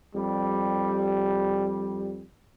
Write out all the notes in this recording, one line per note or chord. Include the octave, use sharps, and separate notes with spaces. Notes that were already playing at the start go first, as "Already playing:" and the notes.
F2 G3